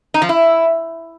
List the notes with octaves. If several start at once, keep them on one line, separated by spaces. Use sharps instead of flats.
D#4
F3
E4